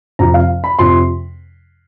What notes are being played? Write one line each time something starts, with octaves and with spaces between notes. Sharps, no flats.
F2 C3 F3 A#5
F5
B5
F2 C3 F3 C6